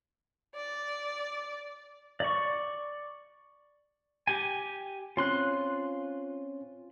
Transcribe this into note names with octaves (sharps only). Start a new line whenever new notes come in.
D5
D5 C#6
G4 G#5
C4 C#4 F4 C6 F#6